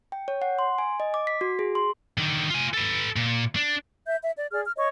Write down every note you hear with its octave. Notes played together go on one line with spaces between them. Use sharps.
G5
C#5
F#5
C6
G#5
D#5
D6
B6
F#4
G#4
C6
D3 D#3
F4 G#5
A4 B4
A#2
D4
E5 G6
E5
D5
G#4 D5 F6
F6
C#5 D#5 C#6